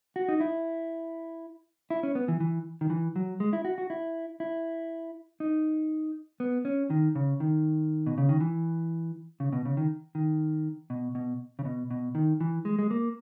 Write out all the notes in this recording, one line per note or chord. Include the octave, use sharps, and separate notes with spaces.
F#4
D#4
E4
E4
C#4
B3
E3
E3
D#3
E3
F#3
G#3
E4
F#4
F#4
E4
E4
D#4
B3
C#4
D#3
C#3
D#3
B2
C#3
D#3
E3
C#3
B2
C#3
D#3
D#3
B2
B2
C#3
B2
B2
D#3
E3
G#3
G#3
A#3